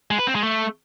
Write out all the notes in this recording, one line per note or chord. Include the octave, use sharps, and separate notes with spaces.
G#3
B4
C4
G#3
A3